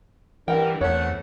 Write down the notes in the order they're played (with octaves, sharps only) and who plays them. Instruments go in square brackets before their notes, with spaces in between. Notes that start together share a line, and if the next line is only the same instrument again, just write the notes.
[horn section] G2 D4 A#4 [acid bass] E3 [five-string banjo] F#5 G5
[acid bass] E2 [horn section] A3 C4 F#5 [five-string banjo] C#5